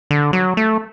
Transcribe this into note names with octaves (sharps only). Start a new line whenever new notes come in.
D3
F#3
A3